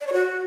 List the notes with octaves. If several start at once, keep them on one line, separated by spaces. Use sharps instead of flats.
D5
C#5
F#4